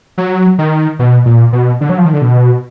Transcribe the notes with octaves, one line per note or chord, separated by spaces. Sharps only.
F#3
D#3
B2
A#2
B2
D3
F#3
F3
D#3
D3
B2